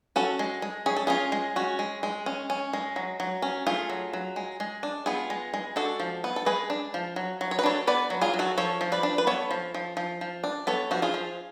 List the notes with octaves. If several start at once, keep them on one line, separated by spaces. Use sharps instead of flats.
C#4 F#4 A4
G#3
G#3
C#4 G#4
A4
C#4 F4 G#4
G#3
C#4 F#4
G#3
G#3
C#4
C#4
G#3
F#3
F#3
C#4
A3 F4 G#4
F#3
F#3
G#3
G#3
D4
B3 F4 G#4
G#3
G#3
D4 F#4 A4
F3
B3
A4
G#3 G#4 B4
D4
F3
F#3
F#3
C#5
B4
D4 A4 C#5
B3 B4 D5
F#3
F4 G#4
F#3
F#4 A4
F3 A4 C#5
F3
B4 D5
D4
B4
B3 A4 C#5
F3
F3
F3
F3
D4
B3 A4 C#5
F3 F#4
F4 G#4
F3